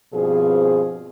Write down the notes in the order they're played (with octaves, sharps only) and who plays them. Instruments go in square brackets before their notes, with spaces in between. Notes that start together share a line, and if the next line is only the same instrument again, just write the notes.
[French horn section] G2 B2 F3 C4 G#4